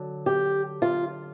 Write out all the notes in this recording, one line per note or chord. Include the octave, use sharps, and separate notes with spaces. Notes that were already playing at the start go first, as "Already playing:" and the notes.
Already playing: D3 F#3
G4
F4